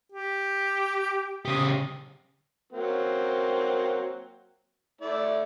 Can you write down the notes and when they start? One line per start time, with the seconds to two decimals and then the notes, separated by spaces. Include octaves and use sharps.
0.12 G4
1.45 C#3 G4 D#6
2.73 F#3 A#3 C4
5.01 A3 E4 D5